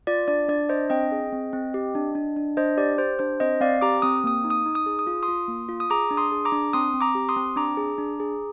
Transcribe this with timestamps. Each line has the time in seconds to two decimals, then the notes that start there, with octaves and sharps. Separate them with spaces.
0.07 F4 D5
0.28 D4 D5
0.48 D4 D5
0.69 D4 C5 D#5
0.90 C4 D#5 G5
1.12 G#4
1.33 C4
1.53 C4
1.74 G4
1.95 D4
2.15 D4
2.36 D4
2.57 D4 C5 D#5
2.77 G4 D5
2.98 G4 C5
3.19 D4 C5
3.40 C4 C5 D#5
3.61 C4 D5 F5
3.81 G4 A#5 D6
4.02 C4 D#6
4.24 A#3 D#6
4.44 D#4
4.50 D#6
4.66 D#4
4.75 D#6
4.86 G#4
4.99 D#6
5.07 F4
5.23 C6 D#6
5.28 F4
5.48 A#3
5.69 F4
5.80 D#6
5.90 G#4 A#5 D6
6.11 D4
6.17 C6 D#6
6.32 G#4
6.45 A#5 D6
6.52 D4
6.73 C4 C6 D#6
6.94 C4
7.01 A#5 D6
7.15 G4
7.29 C6 D#6
7.36 C4
7.56 D4 A#5 D6
7.77 G#4
7.98 D4
8.20 G#4